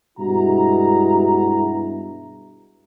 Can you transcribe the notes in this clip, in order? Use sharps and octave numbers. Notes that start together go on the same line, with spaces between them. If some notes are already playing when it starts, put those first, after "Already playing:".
G2 B2 G#3 E4 F#4 A#5